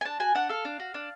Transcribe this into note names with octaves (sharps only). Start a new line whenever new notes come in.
G#5
D4 A5
F#4 G#5
D4 F#5
A4 F5
D4
F#4
D4